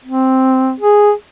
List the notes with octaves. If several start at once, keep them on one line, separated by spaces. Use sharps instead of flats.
C4
G#4